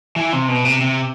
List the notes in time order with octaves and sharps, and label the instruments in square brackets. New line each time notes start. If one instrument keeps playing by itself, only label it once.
[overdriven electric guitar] E3
C3
B2
C3
C3